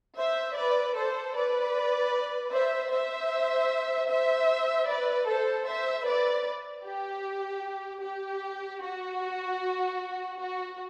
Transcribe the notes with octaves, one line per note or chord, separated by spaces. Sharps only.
C5 E5
B4 D5
A4 C5
B4 D5
C5 E5
C5 E5
C5 E5
B4 D5
A4 C5
C5 E5
B4 D5
G4
G4
F#4
F#4